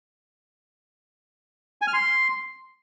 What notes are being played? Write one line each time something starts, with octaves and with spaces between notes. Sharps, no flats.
G#5
F6
C6